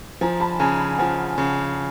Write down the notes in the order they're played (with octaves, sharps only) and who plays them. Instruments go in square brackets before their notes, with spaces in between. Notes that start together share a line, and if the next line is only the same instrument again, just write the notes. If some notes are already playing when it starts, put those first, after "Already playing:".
[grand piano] F3 [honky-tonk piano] G#5 A#5
[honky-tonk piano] A5 B5
[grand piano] C#3 [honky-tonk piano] G#5 A#5
[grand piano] F3 [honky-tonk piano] F#5 G#5
[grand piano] C#3